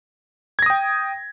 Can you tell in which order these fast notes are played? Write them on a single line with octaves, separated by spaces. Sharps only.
G#6 A#6 D#6 G5